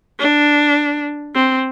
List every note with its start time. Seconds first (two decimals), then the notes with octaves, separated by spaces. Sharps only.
0.19 D4
1.35 C4